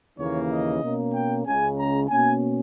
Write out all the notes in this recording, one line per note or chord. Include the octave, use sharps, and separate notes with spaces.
D#2 C#3 E3 A#3 C#5
D#5
B2 A#3 C#4
G5
C#2 C#3 G#3 C#4 G#5
A#5
B2 A#3 C#4 G#5